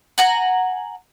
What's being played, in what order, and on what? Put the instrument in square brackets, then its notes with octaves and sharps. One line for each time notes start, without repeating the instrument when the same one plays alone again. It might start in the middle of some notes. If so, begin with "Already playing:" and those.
[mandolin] F#5 G#5 A#5